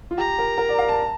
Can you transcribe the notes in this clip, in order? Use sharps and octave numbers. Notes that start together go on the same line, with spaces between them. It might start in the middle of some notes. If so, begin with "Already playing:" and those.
F4
G4 A#5
A#4
A#4
D5
F5
A5